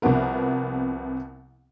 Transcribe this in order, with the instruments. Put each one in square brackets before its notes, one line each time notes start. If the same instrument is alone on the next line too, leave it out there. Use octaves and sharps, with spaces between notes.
[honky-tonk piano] C2 C3 F3 B3 A#4